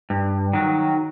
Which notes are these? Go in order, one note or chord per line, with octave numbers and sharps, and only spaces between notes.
G2
D#3 F#3